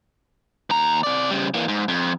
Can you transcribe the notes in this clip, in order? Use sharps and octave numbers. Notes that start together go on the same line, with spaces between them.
D#2 A#5
C3 D5
C#3 G3
E3 A#3
G#2
F2